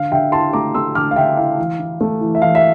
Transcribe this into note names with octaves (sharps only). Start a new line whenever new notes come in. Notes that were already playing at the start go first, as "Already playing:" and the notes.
Already playing: D3 F5
D3 E5 G5
E4 A5 C6
A3 A#5 D6
A3 C6 E6
D3 D6 F6
F5
D3 E5 G5
E4 F5
E3
E4
A3
E3
E5
E3 F5
E5